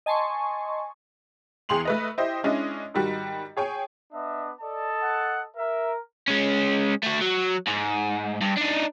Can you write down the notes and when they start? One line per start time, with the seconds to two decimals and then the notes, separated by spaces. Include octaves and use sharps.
0.06 D#5 G#5 A5 C6 C#6
1.69 E2 G#4 G5 C6 F7 F#7
1.85 A3 B4 D#5
2.18 E4 G4 C5 D#5 E5
2.44 G#3 C#4 D4 E4 D#5
2.94 G#2 D#3 G3 F#4
3.57 G#4 C#5 G5 G#5
4.13 B3 D4 D#5 E5
4.62 A4 D5 D#5 A5
5.02 F#5
5.57 A#4 E5
6.28 G#3 C#4
7.03 A3 F#4
7.22 F#3
7.68 G#2
8.42 G2
8.58 D4 D#4